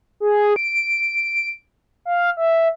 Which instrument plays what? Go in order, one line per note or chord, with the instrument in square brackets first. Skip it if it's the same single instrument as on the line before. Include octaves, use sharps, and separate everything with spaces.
[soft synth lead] G#4
D7
F5
E5